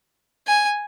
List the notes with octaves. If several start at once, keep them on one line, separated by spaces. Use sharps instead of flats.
G#5